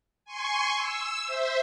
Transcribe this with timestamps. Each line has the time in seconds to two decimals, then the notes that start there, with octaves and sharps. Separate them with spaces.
0.25 G#5 C6 C#6
0.76 E6
1.26 C5 E5